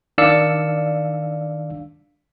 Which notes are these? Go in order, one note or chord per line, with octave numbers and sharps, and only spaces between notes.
D#3 D4 D5 F5 E6 C#7